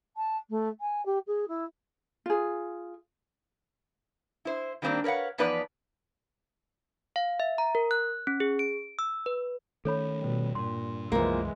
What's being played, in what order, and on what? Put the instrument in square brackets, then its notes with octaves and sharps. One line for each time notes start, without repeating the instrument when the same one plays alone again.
[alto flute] A5
A3
G#5
G4
G#4
E4
[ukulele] F4 G#4
[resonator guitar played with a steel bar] E4 C5
D#3 G3 A#3 C4 D4 C5
A#4 B4 C#5 F5 F#5
E2 F3 B3 D#4 B4 D5
[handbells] F5
E5
A#5
A#4
F#6
C#4
G#4
D7
E6
B4
[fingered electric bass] D#3 A3 C#4 [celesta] A4 C#5 B5
[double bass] B2 G3
[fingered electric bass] G2 [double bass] A#2 [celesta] C6
[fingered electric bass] C2 F#2 [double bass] E3 G#3 [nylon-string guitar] F3 A#3